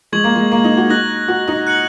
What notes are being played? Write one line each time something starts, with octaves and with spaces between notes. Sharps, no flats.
G#3 C#6 G#6 F#7
A#3
G#3
A#3
D#4
F#4
D#4 F#6 A#6 F#7
F#4
D#4
F#6 C#7 F#7